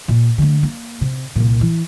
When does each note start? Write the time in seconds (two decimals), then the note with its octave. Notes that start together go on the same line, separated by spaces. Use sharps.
0.08 A#2
0.38 D3 A3
0.63 A#3
1.01 C3
1.36 C2 A#2
1.61 E3